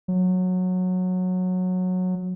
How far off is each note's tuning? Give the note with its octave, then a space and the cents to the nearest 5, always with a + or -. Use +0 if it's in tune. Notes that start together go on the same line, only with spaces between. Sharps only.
F#3 -15